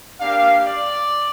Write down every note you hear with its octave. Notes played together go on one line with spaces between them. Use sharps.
A#3 D4 G4 F5
D5